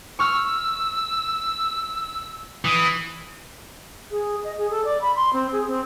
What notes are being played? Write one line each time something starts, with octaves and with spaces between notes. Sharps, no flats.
C#6 E6 F6
E3 D#6
G#4
D#5
G#4
A4
D5
B5
C6
C4
G#4
C4